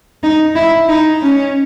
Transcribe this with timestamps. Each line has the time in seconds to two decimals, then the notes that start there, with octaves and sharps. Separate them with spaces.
0.23 D#4
0.55 E4
0.89 D#4
1.22 C#4